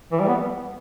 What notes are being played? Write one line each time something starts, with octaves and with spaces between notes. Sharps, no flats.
E3
G3
B3